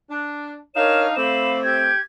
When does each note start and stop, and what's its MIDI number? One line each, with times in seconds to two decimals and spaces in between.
0.09 0.57 62
0.75 1.15 62
0.75 1.15 63
0.75 1.05 70
0.75 1.05 73
0.75 1.15 77
0.75 1.05 89
0.75 1.01 100
1.16 1.89 57
1.16 1.89 60
1.16 1.59 77
1.16 1.59 83
1.16 1.59 86
1.16 1.51 100
1.64 1.99 67
1.64 1.99 91
1.64 2.02 92